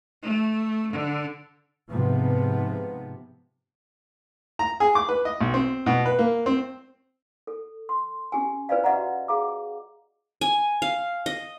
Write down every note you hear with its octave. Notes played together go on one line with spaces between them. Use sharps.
A3
D3
G#2 C3 F3 B3
A#5
G#4
D6
B4
D#5
B1
C4
B2
B4
A#3
C4
A4
C6
C#4 G4 G#5
F4 B4 C5 D5 D#5 F5
F#4 G4 D#5 E5 F#5 A#5
G#4 F5 A#5 D6
G#5
F5
D#5